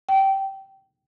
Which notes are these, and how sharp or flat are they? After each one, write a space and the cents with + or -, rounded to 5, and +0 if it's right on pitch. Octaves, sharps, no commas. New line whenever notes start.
G5 -15